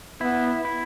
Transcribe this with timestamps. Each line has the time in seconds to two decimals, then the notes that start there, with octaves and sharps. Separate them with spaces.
0.21 B3 E4
0.65 E4